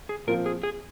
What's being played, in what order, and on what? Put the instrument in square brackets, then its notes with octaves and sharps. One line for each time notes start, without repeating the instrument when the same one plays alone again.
[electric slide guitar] G#4
[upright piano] A#2 F3 C4 F4 [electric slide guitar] A#4
[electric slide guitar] G#4
G#4